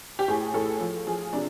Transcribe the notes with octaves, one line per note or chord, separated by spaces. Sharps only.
G4
A2 G#4
A2 A4
F3
F3 G#4
C3 D4